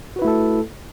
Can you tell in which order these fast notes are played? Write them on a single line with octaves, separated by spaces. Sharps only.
F#4 B4 E4 A3 A4